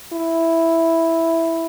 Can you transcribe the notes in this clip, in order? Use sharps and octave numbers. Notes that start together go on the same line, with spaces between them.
E4